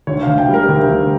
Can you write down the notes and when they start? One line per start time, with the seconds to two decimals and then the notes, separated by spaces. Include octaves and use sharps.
0.07 D2 C#5
0.23 F5
0.27 D2
0.38 G5
0.49 G3
0.54 A#4
0.69 D2
0.89 D2